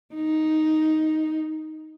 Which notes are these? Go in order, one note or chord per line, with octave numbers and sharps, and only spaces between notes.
D#4